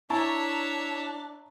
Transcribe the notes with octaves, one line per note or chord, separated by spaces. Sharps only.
D4 E4 C#5 E5 A5 A#5 C#6